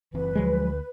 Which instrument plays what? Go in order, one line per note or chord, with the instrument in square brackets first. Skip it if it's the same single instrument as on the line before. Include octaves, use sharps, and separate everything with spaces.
[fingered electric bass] F#1 E3 C4 [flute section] B4
[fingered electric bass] D2 [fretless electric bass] F3 F#3 G#3